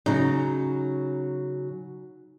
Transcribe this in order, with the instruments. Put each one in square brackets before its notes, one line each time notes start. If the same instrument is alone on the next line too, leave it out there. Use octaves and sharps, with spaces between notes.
[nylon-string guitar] C#3 F#3 [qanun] D#4